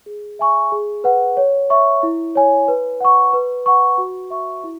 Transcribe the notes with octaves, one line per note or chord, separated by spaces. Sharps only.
G#4
E5 G#5 C#6
G#4
B4 F#5
C#5
E5 C#6
E4
C#5 G#5
B4
F#5 C#6
B4
F#5 C#6
F#4
E5 C#6
E4